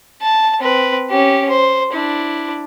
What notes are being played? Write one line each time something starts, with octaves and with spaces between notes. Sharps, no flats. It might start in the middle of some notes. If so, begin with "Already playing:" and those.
A5
C4 B4
C#4 G4
C5
D4 E4